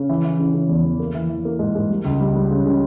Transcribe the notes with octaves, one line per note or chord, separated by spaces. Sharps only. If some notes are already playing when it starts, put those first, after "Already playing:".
Already playing: C#3
E3
E3
C#3
C#3
E2
E2
A#3
E3
E3
A#3
G#2
G#2
G3
C#2
G3
G3
C#3
C#3